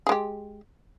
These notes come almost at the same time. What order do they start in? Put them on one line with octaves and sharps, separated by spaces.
G#4 G#3 G4